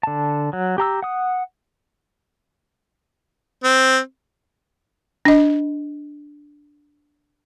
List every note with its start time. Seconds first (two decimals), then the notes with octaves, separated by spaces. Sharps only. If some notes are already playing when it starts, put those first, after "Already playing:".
0.03 D3 A5
0.53 F#3
0.78 G4 A#5 E6
1.02 F#5 D#6
3.64 C4
5.25 D4 D#5